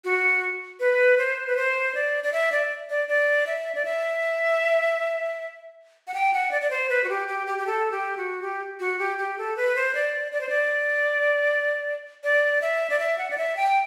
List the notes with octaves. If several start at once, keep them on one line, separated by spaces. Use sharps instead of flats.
F#4
B4
C5
B4
C5
D5
D5
E5
D5
D5
D5
E5
D5
E5
F#5
G5
F#5
D5
D5
C5
B4
F#4
G4
G4
G4
G4
A4
G4
F#4
G4
F#4
G4
G4
A4
B4
C5
D5
D5
C5
D5
D5
E5
D5
E5
F#5
D5
E5
G5